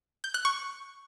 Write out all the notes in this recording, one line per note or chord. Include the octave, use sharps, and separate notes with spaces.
G6
F#6
C#6